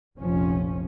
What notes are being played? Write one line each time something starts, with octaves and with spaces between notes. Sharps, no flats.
F1 A#1 F2 F3 C#4